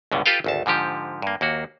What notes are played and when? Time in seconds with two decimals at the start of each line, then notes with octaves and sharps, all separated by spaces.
0.12 C#2 G2 B2 D3
0.26 F4 G4 A4 B4 F5 G5
0.44 G#1 D2 A5
0.66 G#2 D3 F3 G4
1.22 G2 A#3
1.41 D#2 A#3 F#4